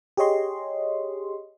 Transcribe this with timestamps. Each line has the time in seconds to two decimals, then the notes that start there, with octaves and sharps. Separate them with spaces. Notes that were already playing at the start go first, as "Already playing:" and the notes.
0.17 G4 G#4 C#5 D#5 C6